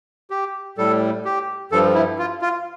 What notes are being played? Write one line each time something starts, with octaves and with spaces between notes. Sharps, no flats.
G4
A2 G3 A4
G4
G2 F3 A4
E4
F4
F4